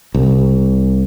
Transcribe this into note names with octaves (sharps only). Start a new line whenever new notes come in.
C2